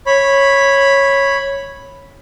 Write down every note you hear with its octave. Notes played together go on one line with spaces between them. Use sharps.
C#5 B5